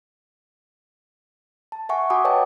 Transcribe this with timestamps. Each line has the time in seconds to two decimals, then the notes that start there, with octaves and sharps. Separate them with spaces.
1.72 A5
1.89 E5 F#5 G#5 C#6
2.10 F#4 F#5 G#5 B5 D6 D#6
2.25 B4 C#5 D#5 G5 A5